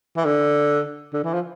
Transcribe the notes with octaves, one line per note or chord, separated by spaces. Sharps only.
E3
D3
D3
E3
F3